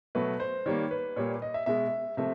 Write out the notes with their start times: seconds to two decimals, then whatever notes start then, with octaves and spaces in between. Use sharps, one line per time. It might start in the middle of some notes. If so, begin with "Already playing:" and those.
0.15 B2 F#3 A3 B4
0.40 C5
0.66 D#3 G3 A#3 C#5
0.91 B4
1.16 A#2 G3 A#3 C#5
1.42 D#5
1.54 E5
1.66 B2 G#3 E5
2.17 C3 F3 A3 E5